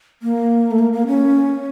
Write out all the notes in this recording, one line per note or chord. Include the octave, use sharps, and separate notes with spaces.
A#3
A3
A#3
A#3
C#4